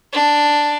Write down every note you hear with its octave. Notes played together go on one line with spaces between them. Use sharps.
D4